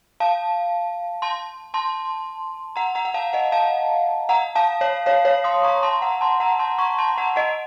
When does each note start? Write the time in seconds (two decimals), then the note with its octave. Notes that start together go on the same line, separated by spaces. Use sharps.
0.20 F5 A5
1.22 A5 C6
1.74 A5 C6
2.76 F#5 A#5
2.95 F#5 A#5
3.05 F#5
3.14 F5 A5
3.33 D#5 F#5
3.52 F5 A5
4.29 F#5 A#5
4.55 F5 A5
4.81 C#5 F5
5.06 C#5 F5
5.25 C#5 F5
5.44 C6 D#6
5.63 A#5 C#6
5.83 A5 C6
6.02 F#5 A#5
6.21 A5 C6
6.40 F#5 A#5
6.59 A5 C6
6.78 A#5 C#6
6.98 A5 C6
7.18 F#5 A#5
7.36 D#5 F#5